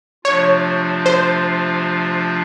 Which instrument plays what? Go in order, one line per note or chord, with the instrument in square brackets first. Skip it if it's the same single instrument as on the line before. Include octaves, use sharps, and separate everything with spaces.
[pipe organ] C3 F3 A3 D4 F4 [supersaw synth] C#5
[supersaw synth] C5